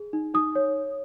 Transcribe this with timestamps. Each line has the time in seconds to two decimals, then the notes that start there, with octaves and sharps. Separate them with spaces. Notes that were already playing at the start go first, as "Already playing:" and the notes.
Already playing: G#4
0.13 D#4
0.34 D#4 D#6
0.55 C#5